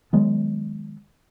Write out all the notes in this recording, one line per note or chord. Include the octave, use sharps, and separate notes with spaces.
D#3 F#3 G#3 B3